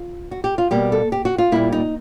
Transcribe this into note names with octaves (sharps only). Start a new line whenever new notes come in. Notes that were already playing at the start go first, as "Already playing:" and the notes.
Already playing: F4
F#4
G4
F4
B2 G3 A#3 G4
A4
G4
F#4
F4
A#2 G3 A#3 E4
D#4